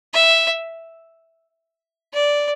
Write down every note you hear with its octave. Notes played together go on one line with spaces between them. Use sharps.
E5
D5